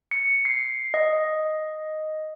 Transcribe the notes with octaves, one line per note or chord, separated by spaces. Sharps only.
C#7
C7
D#5